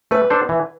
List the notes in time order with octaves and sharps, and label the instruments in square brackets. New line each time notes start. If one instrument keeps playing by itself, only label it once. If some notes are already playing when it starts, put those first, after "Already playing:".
[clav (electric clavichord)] A3 [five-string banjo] B4
[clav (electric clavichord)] D4 A4 C5
E3